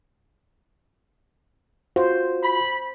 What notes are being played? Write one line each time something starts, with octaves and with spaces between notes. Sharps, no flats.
F4 F#4 C5
B5